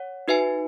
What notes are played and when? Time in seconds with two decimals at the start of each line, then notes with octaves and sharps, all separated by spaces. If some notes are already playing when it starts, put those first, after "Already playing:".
Already playing: C#5 F#5
0.28 D#4 F#4 B4 E5 G#5